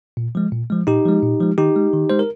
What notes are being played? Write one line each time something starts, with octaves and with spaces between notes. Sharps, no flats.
A#2
F3 G#3
A#2
F3 G#3
A#2 D#4 G4
F3 G#3
A#2
F3 G#3
D#3 D#4 G4
G#3
D#3
G#3 C5
A#4